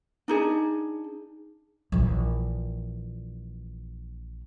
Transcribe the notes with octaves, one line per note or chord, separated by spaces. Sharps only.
D4 D#4 G#4
A#1 E3